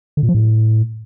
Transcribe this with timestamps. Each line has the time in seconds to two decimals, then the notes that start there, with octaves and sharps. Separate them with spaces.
0.17 D3
0.23 A#2
0.29 F3
0.35 A2